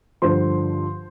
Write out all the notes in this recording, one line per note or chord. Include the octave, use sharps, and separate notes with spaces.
G2 D3 F3 C5 C6